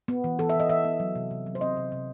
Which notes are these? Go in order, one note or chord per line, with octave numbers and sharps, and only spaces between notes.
B3
E3
E3 A4
E5
E3 D#5
E3 E5
B3
F#3
C3
C3
F#3
C5
C4 D#5
C3
C3